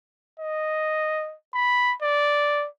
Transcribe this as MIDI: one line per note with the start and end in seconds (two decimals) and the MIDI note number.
0.40 1.35 75
1.54 1.94 83
2.02 2.67 74